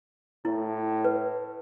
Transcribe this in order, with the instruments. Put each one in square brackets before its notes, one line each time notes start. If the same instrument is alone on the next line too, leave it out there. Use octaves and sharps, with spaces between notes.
[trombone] A2 [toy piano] E4
[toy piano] B4